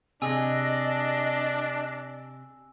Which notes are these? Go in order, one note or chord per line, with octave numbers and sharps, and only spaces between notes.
C3 D4 G#4 D#5 G#5 E6